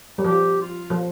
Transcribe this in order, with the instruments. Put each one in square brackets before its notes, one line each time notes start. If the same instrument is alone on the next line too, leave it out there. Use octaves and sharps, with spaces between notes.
[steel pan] G3
[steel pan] F3 [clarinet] G4
[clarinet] F4
[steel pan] F3